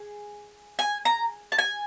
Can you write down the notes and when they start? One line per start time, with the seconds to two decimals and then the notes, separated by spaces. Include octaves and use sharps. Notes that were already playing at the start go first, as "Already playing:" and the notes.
Already playing: G#4
0.79 G#5
1.05 A#5
1.52 A5
1.58 G#5